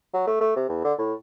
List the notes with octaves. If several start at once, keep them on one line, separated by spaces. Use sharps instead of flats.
F#3
A3
A3
C3
E2
D3
A2